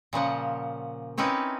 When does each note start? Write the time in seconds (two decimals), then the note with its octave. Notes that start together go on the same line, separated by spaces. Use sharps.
0.13 A#2 C#3 F3 F#5
1.18 C4 C#4 D#4 E4 B4